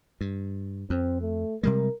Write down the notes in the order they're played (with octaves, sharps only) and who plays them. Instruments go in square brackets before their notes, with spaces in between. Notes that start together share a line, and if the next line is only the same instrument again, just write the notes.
[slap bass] G2
[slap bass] F2 [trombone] C4
[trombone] A3
[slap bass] C3 G3 G#3 [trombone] A#4